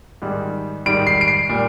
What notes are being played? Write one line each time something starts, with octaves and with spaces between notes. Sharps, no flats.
G#2 D#3 G3
G#2 D#3 G3 D7
C7
D7
C7
A#2 G3